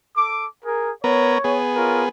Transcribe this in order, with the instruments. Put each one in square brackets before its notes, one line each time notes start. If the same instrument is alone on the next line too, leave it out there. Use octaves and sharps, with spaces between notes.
[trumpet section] A4 D6
G#4 A#4
[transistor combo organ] B3 A#4 [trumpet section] C#5
[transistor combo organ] B3 G#4
[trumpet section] F4 A#4 C#5